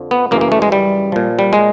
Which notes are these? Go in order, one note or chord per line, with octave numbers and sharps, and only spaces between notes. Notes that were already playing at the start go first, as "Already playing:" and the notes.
Already playing: F2 D3 F3
B3
F#2 C#3 E3 A#3
A#3
A3
G#3
G3
A#2 F3
G3
G#3